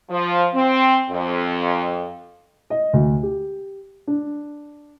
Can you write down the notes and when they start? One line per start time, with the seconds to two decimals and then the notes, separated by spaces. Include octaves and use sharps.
0.10 F3
0.54 C4
1.10 F2
2.70 D#5
2.93 D2
3.23 G4
4.07 D4